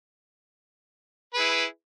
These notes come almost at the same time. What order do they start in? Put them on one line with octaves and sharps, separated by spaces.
B4 G#4 E4